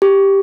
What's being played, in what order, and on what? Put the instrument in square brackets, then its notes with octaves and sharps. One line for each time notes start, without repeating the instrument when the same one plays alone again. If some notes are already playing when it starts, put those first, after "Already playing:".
[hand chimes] G4